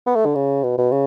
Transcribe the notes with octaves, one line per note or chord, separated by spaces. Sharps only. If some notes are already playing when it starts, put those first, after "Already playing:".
B3
A3
D3
C#3
B2
B2
C#3